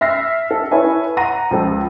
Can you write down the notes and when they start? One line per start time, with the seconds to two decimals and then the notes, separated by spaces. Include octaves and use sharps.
0.01 E5 F6 A#6 C7
0.51 A4
0.71 E4 A4 B4 C#5 E5 G#5
1.17 F#5 A#5 A#6 D#7
1.51 C#2 F3 A4